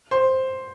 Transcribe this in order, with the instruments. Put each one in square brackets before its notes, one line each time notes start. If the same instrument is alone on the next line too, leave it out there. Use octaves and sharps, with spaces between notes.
[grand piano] C5